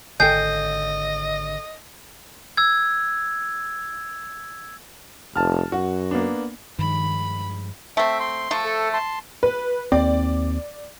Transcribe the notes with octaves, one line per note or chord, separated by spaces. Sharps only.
G#1 D3 A4 D#5 G5 G#5 G6 C7
E6 G#6
F1 A5 F6
F#2 F#4
A#3 B3 D4
G2 D#3 F3 G#3 B5
A3 C4 E5
C6
F3 A3
A4
A5 C6
B4
D#2 C4 D5